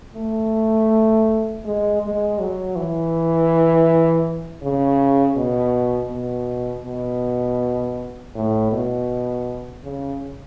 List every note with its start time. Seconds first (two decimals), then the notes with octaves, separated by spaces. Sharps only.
0.16 A3
1.65 G#3
2.02 G#3
2.39 F#3
2.76 E3
4.63 C#3
5.37 B2
6.11 B2
6.86 B2
8.35 A2
8.72 B2
9.84 C#3